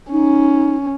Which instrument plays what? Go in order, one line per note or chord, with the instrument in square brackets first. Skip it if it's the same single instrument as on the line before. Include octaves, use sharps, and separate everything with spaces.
[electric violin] C#4 [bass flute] D#4